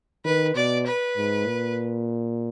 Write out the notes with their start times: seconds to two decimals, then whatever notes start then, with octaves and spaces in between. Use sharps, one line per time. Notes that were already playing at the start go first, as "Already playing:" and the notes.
0.25 D#3 B4
0.55 B2 D5
0.87 B4
1.17 G#2
1.48 A#2